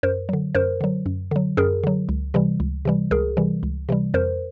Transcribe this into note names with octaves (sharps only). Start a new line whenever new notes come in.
F#2 A#4 C5
D3 F#3
F#2 A#4 C5
D3 F#3
F#2
D3 F#3
F#2 G#4 A#4
D3 F#3
C#2
C3 E3 G3
C#2
C3 E3 G3
C#2 G#4 A#4
C3 E3 G3
C#2
C3 E3 G3
F2 A#4 C5